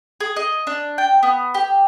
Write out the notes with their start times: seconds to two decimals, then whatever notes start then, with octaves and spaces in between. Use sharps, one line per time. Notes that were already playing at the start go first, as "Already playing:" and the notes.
0.20 G#4
0.36 D#5
0.67 D4
0.98 G5
1.23 B3
1.54 G4